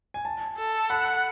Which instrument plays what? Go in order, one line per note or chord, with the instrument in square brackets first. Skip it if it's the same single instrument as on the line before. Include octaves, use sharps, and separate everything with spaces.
[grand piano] G#5
A5
[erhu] A4
[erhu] F#5 [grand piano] B5